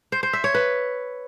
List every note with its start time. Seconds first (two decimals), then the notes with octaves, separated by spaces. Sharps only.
0.12 C5
0.23 C5
0.33 E5
0.44 C#5
0.54 B4